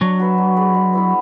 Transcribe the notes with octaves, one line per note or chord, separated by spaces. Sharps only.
F#3 D4
F#4 B4 E5
D4
G#4 B4 D5
G#3
B3 E4 B4